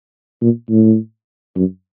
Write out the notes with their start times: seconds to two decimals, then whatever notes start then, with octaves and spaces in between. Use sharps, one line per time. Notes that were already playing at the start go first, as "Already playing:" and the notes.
0.41 A#2
0.70 A2
1.55 F#2